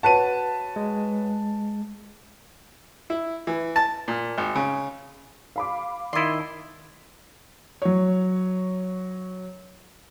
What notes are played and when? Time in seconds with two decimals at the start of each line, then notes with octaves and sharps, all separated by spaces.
0.03 F#4 B4 C#5 A5 D#7
0.76 G#3
3.10 E4
3.47 E3
3.76 A5
4.08 A#2
4.38 G#1
4.56 C#3
5.56 F5 B5 D6
6.13 D#3 E4 D5 D#5 C6
7.82 F#3 C#5